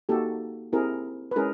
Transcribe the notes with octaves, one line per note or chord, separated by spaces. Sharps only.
A#3 D#4 F#4 G4 A4
C4 E4 G4 G#4 A#4
B4
G#3 C#4 E4 G#4 A#4